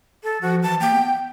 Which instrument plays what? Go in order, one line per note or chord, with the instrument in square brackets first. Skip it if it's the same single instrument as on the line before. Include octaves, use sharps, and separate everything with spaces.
[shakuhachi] A4
[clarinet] F3 [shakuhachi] F#4
[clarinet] E3 [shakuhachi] A5
[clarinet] A#3 [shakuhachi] G5
[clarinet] B3